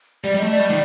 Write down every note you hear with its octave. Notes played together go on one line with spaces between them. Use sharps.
G3 D5
G3 D#5
A3
D5
G3
D#3